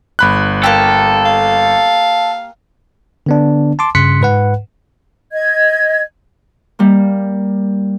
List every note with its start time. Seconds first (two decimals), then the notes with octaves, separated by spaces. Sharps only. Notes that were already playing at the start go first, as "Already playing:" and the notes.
0.19 G1 B5 F#6
0.64 A#3 G4 A4
1.25 F5
3.26 D3 B3 D4
3.79 A5 C6 D6
3.95 G2 C#3 C6 F#6 B6 C#7
4.21 G#2 B4 F#5
5.33 D#5 G#6
6.79 G3 A#3